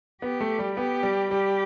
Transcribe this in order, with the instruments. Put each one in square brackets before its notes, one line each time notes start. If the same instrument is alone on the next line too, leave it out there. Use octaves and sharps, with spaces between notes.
[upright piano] B3 [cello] G4
[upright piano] A3
G3
[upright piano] B3 [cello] G4
[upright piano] G3
[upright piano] G3 [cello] G4